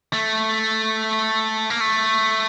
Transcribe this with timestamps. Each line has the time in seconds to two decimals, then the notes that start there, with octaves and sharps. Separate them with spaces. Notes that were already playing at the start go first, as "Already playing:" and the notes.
0.13 A3
1.70 A#3
1.81 A3